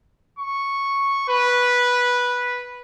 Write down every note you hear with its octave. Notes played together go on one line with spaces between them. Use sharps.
C#6
B4